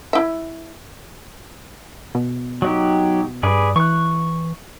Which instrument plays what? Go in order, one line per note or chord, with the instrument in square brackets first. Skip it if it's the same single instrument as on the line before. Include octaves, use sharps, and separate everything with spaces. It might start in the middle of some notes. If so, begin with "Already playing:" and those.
[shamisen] E4 E5
[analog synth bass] B2
[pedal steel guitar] F#3 D#4 G4
[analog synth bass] G2 [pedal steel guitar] G#4 B4 D5
[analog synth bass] E3 [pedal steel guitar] C#6 F#6